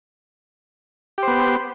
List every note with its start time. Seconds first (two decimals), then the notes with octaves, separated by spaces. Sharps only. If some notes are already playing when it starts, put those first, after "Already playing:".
1.18 G4
1.23 C5
1.28 B3